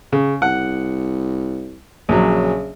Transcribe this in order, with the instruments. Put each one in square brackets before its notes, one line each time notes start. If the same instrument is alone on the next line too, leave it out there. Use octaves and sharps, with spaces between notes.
[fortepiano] C#3
[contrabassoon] C2 [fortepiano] F#5
[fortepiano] A#1 F#3 [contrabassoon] C#3